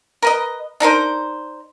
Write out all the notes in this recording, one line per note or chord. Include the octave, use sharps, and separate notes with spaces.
A#4 B4 D#5
D4 D#4 A#4 C5